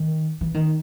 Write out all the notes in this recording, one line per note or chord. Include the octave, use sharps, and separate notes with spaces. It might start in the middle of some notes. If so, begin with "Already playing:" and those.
Already playing: D#3
E3
D#3